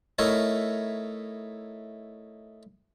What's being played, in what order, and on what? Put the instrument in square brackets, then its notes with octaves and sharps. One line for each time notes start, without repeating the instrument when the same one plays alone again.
[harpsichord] A3 D#4 E4 A#4 C#5